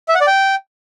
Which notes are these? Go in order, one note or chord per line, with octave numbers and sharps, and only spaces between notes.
E5
F#5
D5
G5